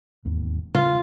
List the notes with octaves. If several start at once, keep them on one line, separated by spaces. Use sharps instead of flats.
E1 D#2 G#2
C#3 F4